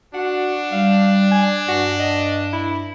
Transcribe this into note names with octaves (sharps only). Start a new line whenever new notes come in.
D4 F#4 F#5
G3 F5
G#5
G2 F#4
D#5
E4